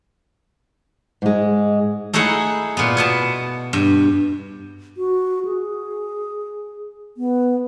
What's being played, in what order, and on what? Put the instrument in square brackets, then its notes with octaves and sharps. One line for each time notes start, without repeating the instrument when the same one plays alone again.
[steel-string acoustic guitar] G#2 G#3
[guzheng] A3 D#4 E4 G#4 F#5
A#2 B3
B2 B3 A5
G2
[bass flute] F#4
G#4
B3